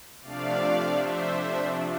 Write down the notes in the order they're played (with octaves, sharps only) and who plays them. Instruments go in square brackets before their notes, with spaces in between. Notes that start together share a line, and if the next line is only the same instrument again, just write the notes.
[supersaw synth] C3 F3 A3 D4 D5 F5
C5 E5